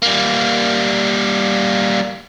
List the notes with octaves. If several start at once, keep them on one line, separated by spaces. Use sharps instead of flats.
G3 A#3